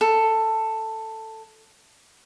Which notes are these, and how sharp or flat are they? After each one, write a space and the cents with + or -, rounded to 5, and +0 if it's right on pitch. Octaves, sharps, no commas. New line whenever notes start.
A4 +10